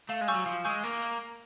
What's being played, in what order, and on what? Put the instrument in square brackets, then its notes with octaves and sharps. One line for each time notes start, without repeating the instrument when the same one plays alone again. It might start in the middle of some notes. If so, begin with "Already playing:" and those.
[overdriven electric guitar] A3 [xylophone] F5
[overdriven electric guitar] G#3
[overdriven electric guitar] G3 [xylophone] G#5 C#6 E6 G6
[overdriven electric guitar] F#3
[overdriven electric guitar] F3 [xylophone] F5
[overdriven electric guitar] G#3 [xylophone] G#5 C#6 E6 G6
[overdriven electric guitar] A#3 [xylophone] A#4